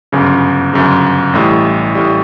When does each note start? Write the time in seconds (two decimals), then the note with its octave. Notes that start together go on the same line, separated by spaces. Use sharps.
0.12 G1 F#2 C#3
0.73 G1 F#2 C#3
1.33 A1 A2 G3
1.95 A2 G3